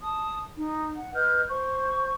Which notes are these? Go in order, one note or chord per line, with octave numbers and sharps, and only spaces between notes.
A5 D#6
D#4
F#5
B4 D#5 F6 G6
C5 C#6